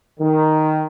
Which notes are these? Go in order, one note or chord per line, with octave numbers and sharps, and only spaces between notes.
D#3